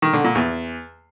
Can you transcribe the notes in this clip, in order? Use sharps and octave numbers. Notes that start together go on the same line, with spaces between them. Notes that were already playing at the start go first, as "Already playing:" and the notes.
D#3
D3
A#2
E2